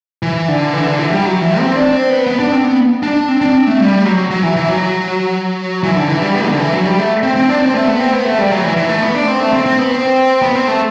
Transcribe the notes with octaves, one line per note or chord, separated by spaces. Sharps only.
E3
D3
E3
D3
E3
G3
F#3
E3
C4
D4
C4
B3
B3
D4
C4
B3
D4
C4
D4
C4
A3
G3
F#3
F#3
E3
E3
F#3
E3
D3
E3
G3
B3
D3
E3
F#3
G3
A3
C4
C4
D4
C4
A3
B3
C4
B3
A3
G3
F#3
E3
E3
A3
B3
D4
C4
A3
C4
C4
B3
C4
B3
C4
A3